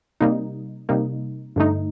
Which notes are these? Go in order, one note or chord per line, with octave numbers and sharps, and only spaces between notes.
C3 G3 A#3 D#4
C3 G3 A#3 D#4
G2 D3 A3 D#4